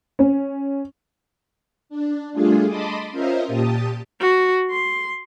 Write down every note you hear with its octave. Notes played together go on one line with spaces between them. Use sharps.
C#4
D4
G3 A3 D4 F4 G#4
D#5 A5 B5 C6 D6 D#6
C#4 F4 A#4 C5 D#5 E5
A#2 G4 A5 D#6
F#4
C6